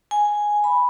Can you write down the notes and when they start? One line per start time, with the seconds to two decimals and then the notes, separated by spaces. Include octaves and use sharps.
0.11 G#5
0.64 B5